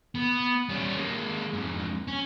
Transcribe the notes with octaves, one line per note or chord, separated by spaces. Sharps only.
B3
G3 C#4
G#3 A#3
F2 G#2
C#4